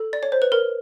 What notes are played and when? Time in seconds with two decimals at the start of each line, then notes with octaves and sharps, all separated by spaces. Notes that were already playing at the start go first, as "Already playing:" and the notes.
Already playing: A4
0.13 D5
0.23 C#5
0.32 C5
0.42 B4
0.52 A#4